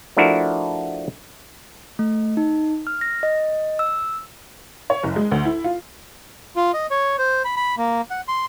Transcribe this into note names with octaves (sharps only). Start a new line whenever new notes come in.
F3 A3 D4 E4 F#4 A#4
A3
D#4
F6
A#6
D#5
E6
C#5
F#1
G#3
D2
E4
F4
F4
D#5
C#5
C5
B5
B5
A#3
F#5
C6